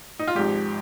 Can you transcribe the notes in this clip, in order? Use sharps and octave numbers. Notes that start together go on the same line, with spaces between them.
D#4
F4
G#1 G#2 F3 G4